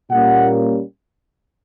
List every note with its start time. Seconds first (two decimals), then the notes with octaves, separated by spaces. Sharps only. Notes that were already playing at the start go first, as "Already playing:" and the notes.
0.10 A#2 G3 A#3 C#4 F#5